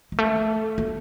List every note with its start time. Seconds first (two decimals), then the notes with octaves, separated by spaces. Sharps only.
0.12 G#3
0.18 A3
0.78 A#3